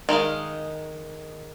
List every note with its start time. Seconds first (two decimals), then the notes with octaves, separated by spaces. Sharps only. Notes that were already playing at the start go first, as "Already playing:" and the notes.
0.09 D#3 G#3 D#4 F5